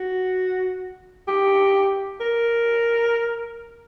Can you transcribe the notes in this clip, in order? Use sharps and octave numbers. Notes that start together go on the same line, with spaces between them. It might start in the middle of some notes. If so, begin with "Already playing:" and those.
Already playing: F#4
G4
A#4